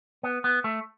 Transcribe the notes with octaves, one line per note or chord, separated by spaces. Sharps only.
B3
B3
A3